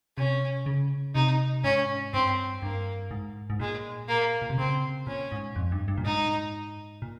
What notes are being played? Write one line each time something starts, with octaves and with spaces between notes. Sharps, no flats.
C3 C#4
C#3
C3 D#4
G#2 C#4
G2 C4
G2 A#3
G#2
G#2
A#2 G#3
A#3
A#2
C3
C#3 C4
A#2 C#4
G#2
F2
G2
G2
A#2
G#2 D#4
A#2